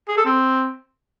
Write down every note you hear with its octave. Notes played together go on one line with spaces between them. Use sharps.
G#4
A4
C4